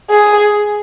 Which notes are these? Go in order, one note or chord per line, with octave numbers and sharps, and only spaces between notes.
G#4